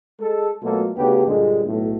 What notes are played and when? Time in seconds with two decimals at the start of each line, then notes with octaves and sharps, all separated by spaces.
0.20 G#3 A4
0.63 B2 F#3 A3 A#3 F4 A4
0.97 D2 C#3 B3 D4 G4
1.27 G2 A#2 D3 G#3
1.66 B1 A2